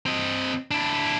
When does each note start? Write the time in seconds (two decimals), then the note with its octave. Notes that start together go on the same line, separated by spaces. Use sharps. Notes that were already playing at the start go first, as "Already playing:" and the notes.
0.06 C4 D#5
0.71 D4 E4